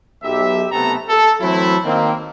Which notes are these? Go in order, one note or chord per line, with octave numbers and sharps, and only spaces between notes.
B1 G4 E5
B1 C3 A3 B3 A4 A#5
A4
E3 F#3 A3 C4 E4
D#3 A#3 C4